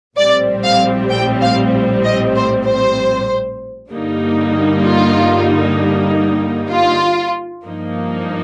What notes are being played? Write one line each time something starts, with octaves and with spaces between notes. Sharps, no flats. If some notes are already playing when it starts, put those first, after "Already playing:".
A#1 A2 G3 C4 D5
F5
G5
F5
D#5
C5
C5
G2 D3 G3 A#3 D#4
F4
F4
G2 F3 A#3 D#4